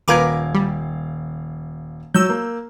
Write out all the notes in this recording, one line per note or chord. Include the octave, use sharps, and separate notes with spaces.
D#1 A#4 B4 F5 D6 G#6
G3
F#3 E6 G6
A#3